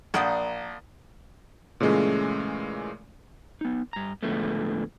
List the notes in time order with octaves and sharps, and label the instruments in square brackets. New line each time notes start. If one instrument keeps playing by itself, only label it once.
[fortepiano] A#1 F#5 D#6 [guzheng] A#3 D5 G5
[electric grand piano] A#2 C#3 E3 G#3 A3 C#4
[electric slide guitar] B3 D#4
G2 A#5
A2 D3 F3 G#3 A3 B3